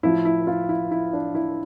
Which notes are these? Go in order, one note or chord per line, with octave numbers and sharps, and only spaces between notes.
A2 F3 E4
E4
F4
E4
E4
D4
E4